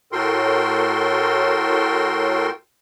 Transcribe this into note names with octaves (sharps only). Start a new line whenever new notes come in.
A2 F#4 A4 A#4 G5 C6